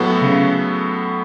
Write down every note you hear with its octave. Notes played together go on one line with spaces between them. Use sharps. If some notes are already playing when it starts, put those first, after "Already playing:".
Already playing: A2 F#3 B3 F#4 A4
C#3